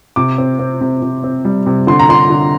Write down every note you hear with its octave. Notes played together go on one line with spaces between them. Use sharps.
C3 D6
C4
C4
C3
C3
C4
G3
C3
D3 C6
A#5
D3 C6
D3